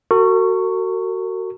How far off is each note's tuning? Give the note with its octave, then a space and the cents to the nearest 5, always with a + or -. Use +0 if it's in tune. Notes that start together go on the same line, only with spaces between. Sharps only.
F#4 +15 A#4 -45 C#6 +0